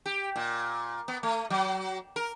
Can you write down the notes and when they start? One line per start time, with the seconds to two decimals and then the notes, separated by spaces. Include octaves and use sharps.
0.06 G4
0.36 A#2
1.08 B3
1.23 A3
1.50 F#3
2.16 A#4